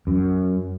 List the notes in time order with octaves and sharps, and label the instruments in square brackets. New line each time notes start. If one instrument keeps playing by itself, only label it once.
[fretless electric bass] F#2